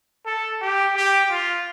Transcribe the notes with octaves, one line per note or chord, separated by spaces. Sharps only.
A4
G4
G4
F4